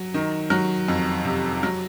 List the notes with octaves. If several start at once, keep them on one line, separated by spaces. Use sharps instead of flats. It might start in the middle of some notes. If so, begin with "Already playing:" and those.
Already playing: F#3
D#3
F#3
F2
C3
F#3